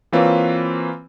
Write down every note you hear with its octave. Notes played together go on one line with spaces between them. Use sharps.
E3 A#3 C4 F4 B4 C#5